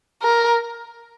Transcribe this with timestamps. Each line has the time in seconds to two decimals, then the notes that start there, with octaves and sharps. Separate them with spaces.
0.23 A#4